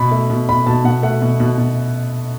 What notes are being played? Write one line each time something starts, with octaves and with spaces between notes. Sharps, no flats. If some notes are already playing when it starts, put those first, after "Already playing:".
Already playing: B2 B5
A3
B2
B2 B5
B2 A5
B2 F#5
A3 F#5
B2
B2
B2